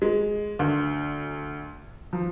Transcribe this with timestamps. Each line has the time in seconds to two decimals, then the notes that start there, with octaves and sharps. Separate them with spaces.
0.02 G#3
0.59 D2
2.13 F3